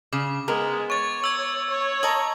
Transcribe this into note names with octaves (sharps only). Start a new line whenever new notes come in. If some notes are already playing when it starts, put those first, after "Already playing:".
C#3 D6
G#3 B3 A#4
C#5 C#6 A6
E6 G#6
C#5
D#5 A5 A#5 F#7